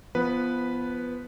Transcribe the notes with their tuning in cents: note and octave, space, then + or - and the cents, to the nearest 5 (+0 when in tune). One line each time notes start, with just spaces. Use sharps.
F3 -20 B3 +0 B4 -5